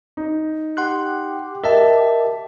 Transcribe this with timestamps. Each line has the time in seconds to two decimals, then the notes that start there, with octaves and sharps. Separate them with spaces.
0.17 D#4
0.77 G4 F#5 C6 F#6
1.64 A#4 D#5 E5 A5